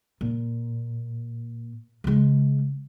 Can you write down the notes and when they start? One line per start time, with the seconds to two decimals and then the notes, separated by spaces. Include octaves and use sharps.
0.21 A#2
2.04 C#3 G#3